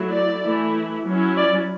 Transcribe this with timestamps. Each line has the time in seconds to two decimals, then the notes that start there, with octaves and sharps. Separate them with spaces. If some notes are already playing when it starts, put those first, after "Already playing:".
Already playing: F#3 A3 E4
0.11 D5
0.42 E3 A3 E4
1.05 F#3 C#4 E4
1.37 D5